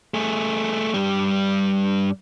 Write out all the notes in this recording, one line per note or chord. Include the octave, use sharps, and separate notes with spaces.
A3 G#4
G2 G3